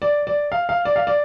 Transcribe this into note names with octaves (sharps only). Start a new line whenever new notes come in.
D5
D5
F5
F5
D5
F5
D5